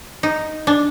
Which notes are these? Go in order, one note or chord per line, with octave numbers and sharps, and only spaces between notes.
D#4
D4